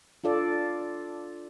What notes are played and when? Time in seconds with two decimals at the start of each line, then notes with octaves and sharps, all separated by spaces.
0.24 D4 F4 A4 D5